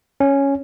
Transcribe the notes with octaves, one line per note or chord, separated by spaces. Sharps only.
C#4